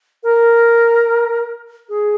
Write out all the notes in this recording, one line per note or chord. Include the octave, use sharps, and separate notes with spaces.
A#4
G#4